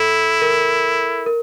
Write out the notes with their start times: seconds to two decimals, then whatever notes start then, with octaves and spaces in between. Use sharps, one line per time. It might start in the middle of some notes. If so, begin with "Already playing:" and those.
Already playing: E4 A4
0.42 A#4
1.26 A#4